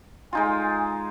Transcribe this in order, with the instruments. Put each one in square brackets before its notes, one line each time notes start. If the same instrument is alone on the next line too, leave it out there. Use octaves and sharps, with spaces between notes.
[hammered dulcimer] G#3 D#4 F4 [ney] G#5